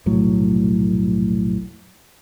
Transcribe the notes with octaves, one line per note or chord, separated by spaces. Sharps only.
F1 B1 A2 F#3